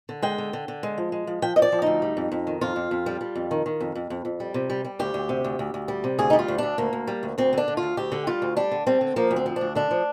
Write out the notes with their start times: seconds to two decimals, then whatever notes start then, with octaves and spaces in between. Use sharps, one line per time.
0.09 D3
0.22 G#3 G5
0.38 D3
0.53 D3
0.68 D3
0.83 G#3
0.98 F3
1.12 G#3
1.27 F3
1.42 F3 G5
1.56 F3 D#5
1.62 D5
1.72 F3
1.82 D2 D#4
2.02 G3
2.17 F2
2.32 F2
2.47 D#3
2.61 F2 F4
2.76 F2
2.91 F2
3.06 G3
3.21 G3
3.36 F2
3.51 D#3
3.66 D#3
3.80 F2
3.95 F2
4.10 F2
4.25 F2
4.40 G3
4.54 C3
4.70 G3
4.85 G3
4.99 D2 G4
5.14 D2
5.29 C3
5.44 D2
5.59 D2
5.74 D2
5.88 G3
6.04 C3
6.19 D2 G#4
6.30 G3 D#4
6.39 F4
6.48 D2
6.58 D2 D4
6.78 D2 A#3
6.93 D2
7.07 G3
7.23 D2
7.38 D2 C4
7.53 D3 D4
7.68 D3
7.77 F4
7.83 D2
7.97 D2 G4
8.12 D3
8.27 G3 F4
8.42 D2
8.57 G3 D4
8.72 D3
8.87 G3 C4
9.01 D3
9.16 F3 A#3
9.31 D2
9.36 C4
9.46 F3
9.56 D4
9.61 D2
9.75 D3 D4
9.91 F3